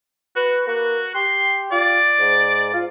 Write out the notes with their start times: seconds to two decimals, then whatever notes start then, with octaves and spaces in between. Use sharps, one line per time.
0.36 F#4 B4
0.67 A#3 F#4
1.15 G4 C6
1.72 F4 D5
2.20 G#2
2.74 F4